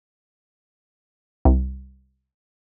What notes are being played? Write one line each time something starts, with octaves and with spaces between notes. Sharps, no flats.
C2